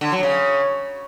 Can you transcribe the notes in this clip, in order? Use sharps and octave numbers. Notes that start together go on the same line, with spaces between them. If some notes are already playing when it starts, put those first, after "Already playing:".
D3
F#3
C#3